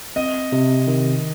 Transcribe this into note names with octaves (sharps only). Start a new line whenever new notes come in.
C4 D#5
C3
D#3